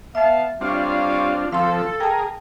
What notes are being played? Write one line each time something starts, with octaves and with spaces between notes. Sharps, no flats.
B3 E5 F5 A5
G3 C4 D4 F4 C#5 F5
F3 C4 A4 F5 C6
G#4 A#4 G5 A5